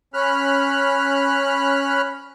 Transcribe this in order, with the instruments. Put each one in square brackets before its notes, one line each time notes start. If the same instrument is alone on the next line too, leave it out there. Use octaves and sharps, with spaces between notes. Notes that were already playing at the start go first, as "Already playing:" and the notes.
[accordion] C#4 B5 F6 F#6